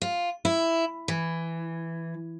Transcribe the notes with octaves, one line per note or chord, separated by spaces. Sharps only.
F4
E4
E3